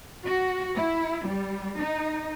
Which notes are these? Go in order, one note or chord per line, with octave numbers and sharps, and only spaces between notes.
F#4
E4
G3
D#4